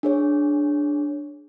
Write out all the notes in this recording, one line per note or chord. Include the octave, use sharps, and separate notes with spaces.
D4 G#4 C#5